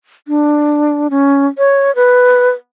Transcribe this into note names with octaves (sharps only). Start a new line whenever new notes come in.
D4
C#4
C#5
B4